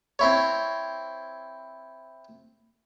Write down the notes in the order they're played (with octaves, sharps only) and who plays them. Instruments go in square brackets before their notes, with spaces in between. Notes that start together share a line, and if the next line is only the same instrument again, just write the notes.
[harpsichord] C4 E4 C#5